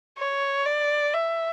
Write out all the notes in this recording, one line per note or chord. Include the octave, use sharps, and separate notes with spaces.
C#5
D5
E5